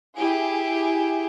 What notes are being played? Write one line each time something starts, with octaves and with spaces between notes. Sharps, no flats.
E4 G4 G#4